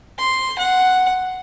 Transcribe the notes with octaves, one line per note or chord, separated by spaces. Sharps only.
C6
F#5